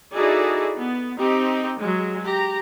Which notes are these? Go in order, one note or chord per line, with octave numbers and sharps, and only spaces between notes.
D#4 E4 F#4 G#4 A4 D5
B3
C4 D#4 G4
F#3 G#3
G4 A#5